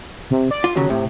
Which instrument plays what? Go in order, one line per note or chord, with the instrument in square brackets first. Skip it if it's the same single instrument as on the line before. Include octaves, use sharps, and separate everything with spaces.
[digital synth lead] C3
D5
[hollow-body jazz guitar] F4
[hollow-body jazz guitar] D#2 C#3 [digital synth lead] F#3
[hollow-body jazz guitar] A2 [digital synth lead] C3